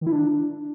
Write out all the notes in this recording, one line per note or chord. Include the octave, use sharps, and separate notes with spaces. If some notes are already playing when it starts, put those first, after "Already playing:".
D#3
E4
D4